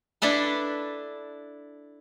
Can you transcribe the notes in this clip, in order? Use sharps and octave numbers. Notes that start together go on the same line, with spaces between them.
D4 E4 A4 B4